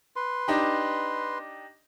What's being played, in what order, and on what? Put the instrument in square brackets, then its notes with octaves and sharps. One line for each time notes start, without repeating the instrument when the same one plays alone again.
[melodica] B4 C6
[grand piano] D4 D#4 G4